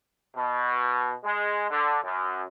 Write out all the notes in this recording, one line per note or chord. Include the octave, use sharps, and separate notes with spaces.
B2
G#3
D3
F#2